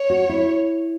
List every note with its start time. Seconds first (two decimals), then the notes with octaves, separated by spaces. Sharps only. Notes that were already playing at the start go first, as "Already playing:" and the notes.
Already playing: C#5
0.10 F#4
0.29 E4